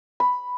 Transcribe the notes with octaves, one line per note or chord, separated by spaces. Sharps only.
B5